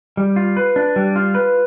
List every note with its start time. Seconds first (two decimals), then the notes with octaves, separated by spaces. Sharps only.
0.17 G3
0.36 F4
0.57 B4
0.76 D4
0.96 G3
1.16 F4
1.35 B4